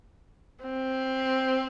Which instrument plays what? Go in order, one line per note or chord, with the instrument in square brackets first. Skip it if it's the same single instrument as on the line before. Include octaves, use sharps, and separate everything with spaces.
[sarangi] C4